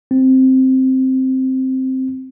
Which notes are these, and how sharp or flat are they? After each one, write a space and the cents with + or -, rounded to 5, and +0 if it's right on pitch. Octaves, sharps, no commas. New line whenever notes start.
C4 +0